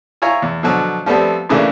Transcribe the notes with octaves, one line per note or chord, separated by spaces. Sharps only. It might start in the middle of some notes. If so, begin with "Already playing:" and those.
E4 F4 C#5 G#5 A#5
E2
B2 D3 F3 F#3
F3 G3 A3 B3 C4
A2 C#3 E3 A3 A#3 D4